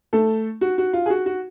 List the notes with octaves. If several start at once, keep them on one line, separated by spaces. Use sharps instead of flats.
A3 A4
F#4
F#4
F4
G#4
F#4
F#4